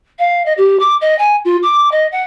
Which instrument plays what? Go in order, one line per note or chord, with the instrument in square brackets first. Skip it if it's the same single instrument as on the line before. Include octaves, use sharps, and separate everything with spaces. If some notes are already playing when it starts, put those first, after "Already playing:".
[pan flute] F5
D#5
G4
D6
D#5
G#5
F4
D6
D#5
F#5